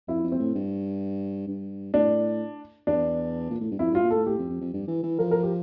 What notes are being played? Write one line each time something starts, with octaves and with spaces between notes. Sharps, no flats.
F2 E4
F2
C4
A2
G2
G2
A2 D4
E2 D4
A#2
A2
G2
F2 E4
G2 F4
A#2
A2 A4
A2 G4
F2
F2
F2
G2
E3
E3
F3 A#4
A#4
G4